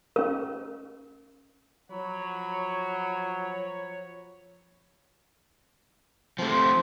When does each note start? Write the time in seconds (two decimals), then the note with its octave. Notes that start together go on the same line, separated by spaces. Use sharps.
0.16 C#4 A#4
1.91 F3 F#3 F#4 C#5 B5
6.38 F3 A3 C4 C5